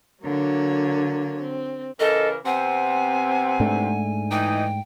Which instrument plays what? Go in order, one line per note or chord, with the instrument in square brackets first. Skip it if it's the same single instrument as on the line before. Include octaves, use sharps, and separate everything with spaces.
[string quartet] D3 F#3 A#3 C#5
C4
[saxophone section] C#3 E3 A#4 [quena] A4 [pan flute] D#5
[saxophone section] C3 B3 C4 [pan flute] F#5 [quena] G#5
[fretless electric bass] G#2 A3 D4
[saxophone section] E3 D#4 [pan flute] G5